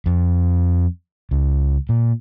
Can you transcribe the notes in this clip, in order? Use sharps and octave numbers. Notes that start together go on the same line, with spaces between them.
F2
C#2
A#2